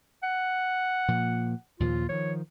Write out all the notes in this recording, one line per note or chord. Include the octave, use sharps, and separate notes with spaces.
F#5
A#2 F3 A#3
D#2 A#2 F3 F4
D#3 F3 C#5